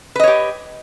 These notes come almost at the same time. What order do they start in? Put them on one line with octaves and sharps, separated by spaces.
B4 D#5 C#5 G4